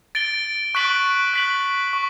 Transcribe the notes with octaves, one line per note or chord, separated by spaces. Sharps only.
A6 D7 G7
C#6 F#6 B6 D7 F#7
F#6 B6 F#7
C#6